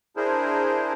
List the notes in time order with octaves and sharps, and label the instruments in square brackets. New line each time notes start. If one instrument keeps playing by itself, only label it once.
[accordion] D4 E4 G#4 A#4 C5